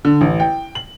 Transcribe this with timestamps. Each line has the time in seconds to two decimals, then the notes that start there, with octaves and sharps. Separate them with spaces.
0.05 D3
0.21 A1
0.40 G5
0.75 F#7